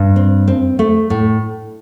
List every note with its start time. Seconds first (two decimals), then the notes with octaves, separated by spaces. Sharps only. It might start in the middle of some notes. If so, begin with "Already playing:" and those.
Already playing: G2
0.16 C4
0.48 C4
0.79 A3
1.10 A2